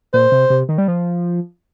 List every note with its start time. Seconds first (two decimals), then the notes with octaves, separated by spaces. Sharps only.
0.14 A#2 C5
0.32 C3
0.50 C3
0.69 D#3
0.78 G3
0.88 F3